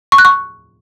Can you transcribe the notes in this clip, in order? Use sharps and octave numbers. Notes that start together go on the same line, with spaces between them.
C#6
F#6
C#6